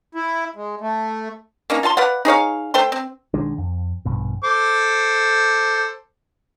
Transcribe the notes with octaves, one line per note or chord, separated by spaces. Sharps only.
E4
G#3
A3
A#3 C#4 D#4
F4 F5 A5 C6
B4 D5 F5 F#5
D#4 G#4 C#5 F5
A3 C5 G5 C6
C4
B1 D#3 G#3 D4
F2
A#1 G2 B2
A4 C5 D6